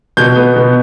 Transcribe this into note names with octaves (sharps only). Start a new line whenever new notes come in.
B2 G6
B3
B2